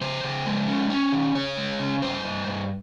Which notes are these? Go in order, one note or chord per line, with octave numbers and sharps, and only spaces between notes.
C#3 C5
C#3
G#3
C#4
C#4
D#3
C#3 C#5
G#3
C#3
G2 C5
G2
G2